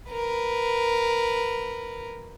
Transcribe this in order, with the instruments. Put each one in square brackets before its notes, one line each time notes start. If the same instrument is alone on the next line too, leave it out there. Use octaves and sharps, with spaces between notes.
[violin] A#4 B4